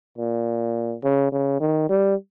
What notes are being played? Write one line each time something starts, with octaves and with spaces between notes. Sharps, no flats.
A#2
C#3
C#3
D#3
G3